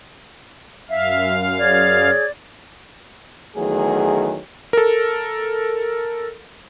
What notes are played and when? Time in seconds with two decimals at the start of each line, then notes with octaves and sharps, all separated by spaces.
0.90 F#2 E5 F5
1.58 G#4 C#5 D5 G#6
3.56 E2 D#3 F#3 A3 G#4
4.73 A4 A#4